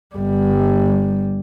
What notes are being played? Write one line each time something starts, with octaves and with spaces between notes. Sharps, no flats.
G1 G3